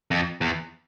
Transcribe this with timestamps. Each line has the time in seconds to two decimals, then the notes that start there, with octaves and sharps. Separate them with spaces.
0.11 F2
0.41 E2